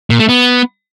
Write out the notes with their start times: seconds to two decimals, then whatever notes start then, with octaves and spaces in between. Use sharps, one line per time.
0.10 A#2
0.19 A3
0.29 B3